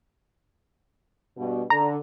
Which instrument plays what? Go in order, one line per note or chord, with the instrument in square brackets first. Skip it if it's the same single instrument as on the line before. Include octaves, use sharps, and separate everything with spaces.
[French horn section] G2 B2
[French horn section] D3 [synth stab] A#5